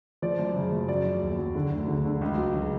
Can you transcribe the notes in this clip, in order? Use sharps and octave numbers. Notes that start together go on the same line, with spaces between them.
F3 D5
F#2
C#3
F#2
F#3 D5
F#3
D#2
F#3
D3
D2
D3
D3
C#2
F#3
C#3